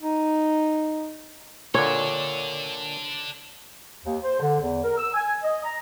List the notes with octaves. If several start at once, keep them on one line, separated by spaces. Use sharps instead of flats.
D#4
A#2 D3 D4 A4 C#5
D#2
C5
D3
E2
A#4
E6
G#5
D#5
A#5